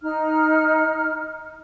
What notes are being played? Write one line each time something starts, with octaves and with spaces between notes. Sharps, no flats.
D#4 F6